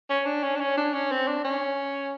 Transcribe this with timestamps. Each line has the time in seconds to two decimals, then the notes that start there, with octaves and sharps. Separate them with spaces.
0.10 C#4
0.26 D4
0.43 C#4
0.55 D4
0.60 C#4
0.77 D4
0.93 C#4
1.11 C4
1.27 D4
1.44 C#4